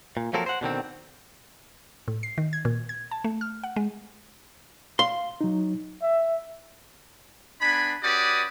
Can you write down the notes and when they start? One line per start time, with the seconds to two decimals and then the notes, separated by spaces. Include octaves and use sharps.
0.17 A#2
0.33 F3 F#3 A#3 C4 A4 A#4
0.46 C5 F#5
0.61 B2 D3 D#3 C4
2.08 A2
2.23 C7
2.38 D#3
2.53 G#6
2.65 A#2
2.89 G#6
3.11 A5
3.24 A3
3.41 F6
3.64 F#5
3.76 G#3
4.99 F5 C6
5.41 F#3 D#4
6.02 E5
7.61 B3 D4 G#5 B5
8.03 C#4 F#4 G4 B4 D5 D#6